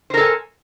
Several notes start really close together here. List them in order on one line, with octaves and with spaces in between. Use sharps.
C5 A#4 A4 G#5